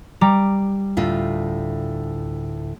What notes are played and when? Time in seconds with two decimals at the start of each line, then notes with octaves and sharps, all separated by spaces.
0.21 G3 A#5 D6
0.97 D2 A2 F4